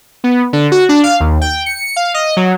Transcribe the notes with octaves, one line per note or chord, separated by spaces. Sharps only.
B3
D3
F#4
D4
F5
D#2
G5
C#7
F5
D#5
F#3